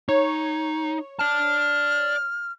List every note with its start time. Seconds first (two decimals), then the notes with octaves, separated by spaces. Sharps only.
0.09 D#4 C#5
1.19 D5 A5 F6